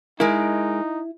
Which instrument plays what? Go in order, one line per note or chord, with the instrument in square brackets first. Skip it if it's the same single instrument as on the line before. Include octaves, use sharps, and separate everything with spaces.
[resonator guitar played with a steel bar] G#3 A#4 [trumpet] D#4 [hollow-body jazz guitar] E4